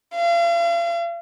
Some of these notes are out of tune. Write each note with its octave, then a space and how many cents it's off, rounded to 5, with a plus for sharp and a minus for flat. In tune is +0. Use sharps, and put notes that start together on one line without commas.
F5 -40